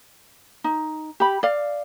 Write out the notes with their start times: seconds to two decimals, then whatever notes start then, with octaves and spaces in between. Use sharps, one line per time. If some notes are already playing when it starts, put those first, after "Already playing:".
0.64 D#4
1.20 G4 B5
1.43 D5 F5